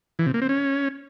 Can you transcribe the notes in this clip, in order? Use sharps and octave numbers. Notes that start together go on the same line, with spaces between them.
E3
C3
A#3
C4
C#4